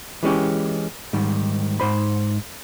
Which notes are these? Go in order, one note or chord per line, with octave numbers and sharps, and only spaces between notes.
E3 G#3 C#4 G4
G#2 D#3 G3
G#2 C5 B5